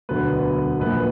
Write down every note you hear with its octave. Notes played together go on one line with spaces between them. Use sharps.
E1 D2 D3 F#3 B3 B4
A#1 A#2 F#3 B3 B4